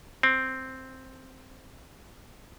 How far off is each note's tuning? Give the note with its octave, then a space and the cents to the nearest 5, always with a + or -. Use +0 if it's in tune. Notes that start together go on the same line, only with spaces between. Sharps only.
C4 +0